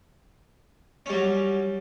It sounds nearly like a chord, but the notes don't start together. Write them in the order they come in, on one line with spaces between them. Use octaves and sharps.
C#4 G3 F#3